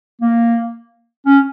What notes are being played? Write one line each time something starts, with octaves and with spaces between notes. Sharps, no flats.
A#3
C#4